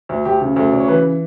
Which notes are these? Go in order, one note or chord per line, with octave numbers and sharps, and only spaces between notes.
D2
D2 G4
C#3
D2 A4
C#3 D5
C#5
E3 B4